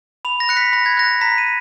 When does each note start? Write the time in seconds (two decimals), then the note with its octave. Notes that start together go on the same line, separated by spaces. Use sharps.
0.25 B5 F7
0.40 A#6
0.49 F#6 C#7
0.57 B6
0.73 B5 A#6
0.86 G#6
0.97 F#6 A#6
1.21 A#5 B6
1.38 D#7